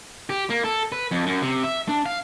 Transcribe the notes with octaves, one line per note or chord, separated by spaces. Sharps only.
G4
A#3
A4
B4
F2
F#2
C3
E5
D4
F5